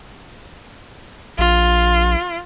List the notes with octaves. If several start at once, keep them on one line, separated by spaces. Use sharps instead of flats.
A#1 F4